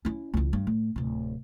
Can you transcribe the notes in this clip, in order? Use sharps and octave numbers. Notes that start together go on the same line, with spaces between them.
C#4 E4
C#2 E3
G2
A2
D1 C3